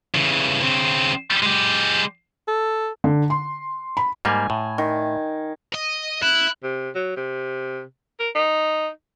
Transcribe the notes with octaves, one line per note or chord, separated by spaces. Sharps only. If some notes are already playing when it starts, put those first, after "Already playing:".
C#3 E3
C#3 C4
G#3 G4
A4
D3
C6
B5
G#2 G3 A#3 G#5
A2
D#3
D#5
E4 F#6
C3
F#3
C3
A#4
D#4